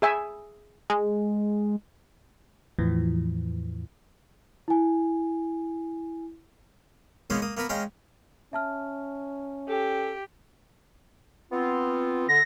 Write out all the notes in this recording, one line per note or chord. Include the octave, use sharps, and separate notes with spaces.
G#4 E5 G#5
G#3
E2 A2 E3 F3
E4 G#5
G#3 A#3 B3 C#4 D#4 F5
A#3 D#6
A#3 B3 A#4 B4
G#3 C#4 F5 G5 A#5
C#4 E5 A5 F6
G4 A4
B3 C4 F4
D3 A#6